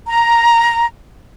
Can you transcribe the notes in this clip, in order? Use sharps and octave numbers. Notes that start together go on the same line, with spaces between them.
A#5